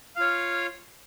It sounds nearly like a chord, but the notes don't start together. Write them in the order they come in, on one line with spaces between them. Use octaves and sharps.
F5 F4 C#5